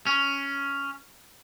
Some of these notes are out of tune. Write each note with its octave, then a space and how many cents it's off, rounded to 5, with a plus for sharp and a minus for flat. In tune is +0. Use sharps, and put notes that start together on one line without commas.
C#4 +5